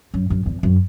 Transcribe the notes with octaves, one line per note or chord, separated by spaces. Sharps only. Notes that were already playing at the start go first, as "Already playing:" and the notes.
F#2
F#2
E2
F#2